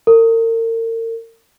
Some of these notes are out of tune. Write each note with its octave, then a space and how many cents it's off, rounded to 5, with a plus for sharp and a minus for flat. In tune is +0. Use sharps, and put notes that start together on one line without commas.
A#4 -40